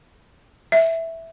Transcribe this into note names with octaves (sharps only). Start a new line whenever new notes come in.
E5